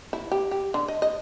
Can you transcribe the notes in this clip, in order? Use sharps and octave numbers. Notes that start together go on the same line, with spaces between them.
E4
G4
G4
D3
D#5
D#5